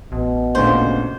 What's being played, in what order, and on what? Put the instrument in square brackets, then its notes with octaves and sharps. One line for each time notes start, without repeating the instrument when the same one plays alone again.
[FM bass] A1 [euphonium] B2
[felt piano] D2 A#2 C#3 [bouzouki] C5